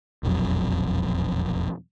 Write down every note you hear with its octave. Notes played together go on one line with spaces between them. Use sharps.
E1 A#1 F2 F#3